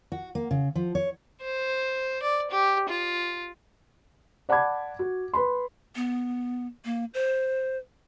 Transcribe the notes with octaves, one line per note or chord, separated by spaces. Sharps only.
F#4
A#3
C#3
F3
C#5
C5
D5
G4
F4
D5 F#5 A5 B5 D6 G#6
F#4
B4 B5 C6
B3
A#3
C5